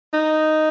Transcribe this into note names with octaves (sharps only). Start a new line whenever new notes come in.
D#4